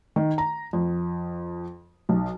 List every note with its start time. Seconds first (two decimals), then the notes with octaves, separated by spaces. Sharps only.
0.16 D#3
0.38 A#5
0.73 F2
2.09 B1